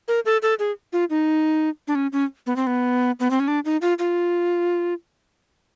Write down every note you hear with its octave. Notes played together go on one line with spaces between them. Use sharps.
A#4
A4
A4
G#4
F4
D#4
D4
C#4
C#4
B3
C4
B3
B3
C4
C#4
D4
D#4
F4
F4